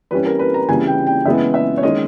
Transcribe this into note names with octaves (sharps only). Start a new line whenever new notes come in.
E3 G3 C#4 B4
A#4
B4
A#5
C#3 E3 G3 G#5
G5
G5
C#3 E3 G#3 B3 E5
E5
C#5
D#3 G#3 C#4 D#5